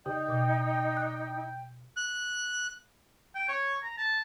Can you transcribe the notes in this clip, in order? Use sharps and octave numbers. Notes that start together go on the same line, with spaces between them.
C#3 D#4 G4 D5 G5 D#6
B2 D6
F#6
F#6
G5
C#5
A#5
A5